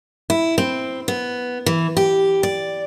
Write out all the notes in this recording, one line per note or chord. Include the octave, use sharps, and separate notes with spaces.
E4
C4
B3
E3
G4
D5